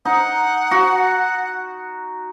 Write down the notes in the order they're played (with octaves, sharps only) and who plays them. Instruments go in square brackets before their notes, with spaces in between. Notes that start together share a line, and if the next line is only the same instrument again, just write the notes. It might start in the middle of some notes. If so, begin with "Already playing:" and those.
[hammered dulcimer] D#4 [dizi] F#5
[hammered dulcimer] F#4